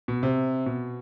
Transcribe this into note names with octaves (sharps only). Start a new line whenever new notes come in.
B2
C3
B2